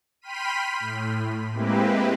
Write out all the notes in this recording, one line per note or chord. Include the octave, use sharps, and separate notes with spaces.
G5 B5 C6 F6 B6 D#7
A2
G#3 A#3 C4 E4 G4 B4